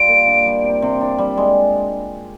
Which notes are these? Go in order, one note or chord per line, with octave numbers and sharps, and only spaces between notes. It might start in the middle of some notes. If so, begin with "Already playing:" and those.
Already playing: G3 F4 D7
A#3
D4
G3
C3
C3
D4
G3
G#3